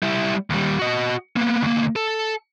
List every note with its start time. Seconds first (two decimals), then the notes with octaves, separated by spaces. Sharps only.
0.03 G3 E4
0.50 D#2 G3
0.79 F#4 D#5
1.36 A#3 B3
1.62 D2 A#3
1.96 A4